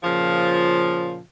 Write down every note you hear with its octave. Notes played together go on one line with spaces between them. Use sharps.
A#2 C#3 F3